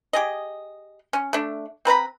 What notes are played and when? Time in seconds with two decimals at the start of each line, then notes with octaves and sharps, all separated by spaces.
0.13 G4 G#4 D#5
1.13 C#4
1.33 A3 D4
1.85 C4 B4 A#5 B5